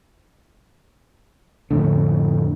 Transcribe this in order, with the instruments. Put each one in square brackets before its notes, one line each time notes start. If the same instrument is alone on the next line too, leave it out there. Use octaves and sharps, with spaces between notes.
[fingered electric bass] F2 A2 D3